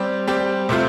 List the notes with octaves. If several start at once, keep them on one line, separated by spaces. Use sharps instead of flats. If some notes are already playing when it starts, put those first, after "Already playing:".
Already playing: G3 C4 G4
G3 C4 G4
C3 A3 C4 F4